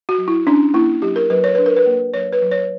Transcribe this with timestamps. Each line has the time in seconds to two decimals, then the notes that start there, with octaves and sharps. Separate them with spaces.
0.09 F#4
0.18 F#3
0.28 E4
0.47 C#4 D4
0.74 A#3 E4
1.02 F#3 G4
1.16 A#4
1.30 F#3 B4
1.44 C#5
1.55 D4 B4
1.66 A#4
1.76 B4
1.86 A#3
2.14 F#3 C#5
2.33 B4
2.42 F#3
2.51 C#5